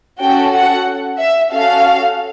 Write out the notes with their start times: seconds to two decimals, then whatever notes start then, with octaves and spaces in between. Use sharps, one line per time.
0.21 C#4 F#4 A4 G5
0.54 F#5
1.19 E5
1.52 C#4 F#4 A4 F5